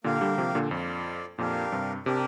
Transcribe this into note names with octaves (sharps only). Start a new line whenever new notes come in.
A#2 D3 A#3 G4 A#4 F5
D3 G3
C3 F3
A#2 D3
F2 F4 D5 F5
F2 A#2 D4 G4 A#4 F5
G2 C3
C3 D4 G4 A#4